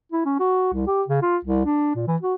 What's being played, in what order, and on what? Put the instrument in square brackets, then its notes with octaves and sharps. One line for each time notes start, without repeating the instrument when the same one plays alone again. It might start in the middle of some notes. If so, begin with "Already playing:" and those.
[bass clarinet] E4
C#4
F#4
C2
G4
C#3
F4
C2
D4
A#2
E3
F#4